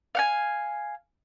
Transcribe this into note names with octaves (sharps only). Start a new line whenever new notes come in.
F5 F#5 G#5